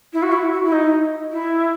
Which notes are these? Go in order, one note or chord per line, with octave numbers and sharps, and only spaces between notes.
E4
F#4
E4
F#4
E4
D#4
E4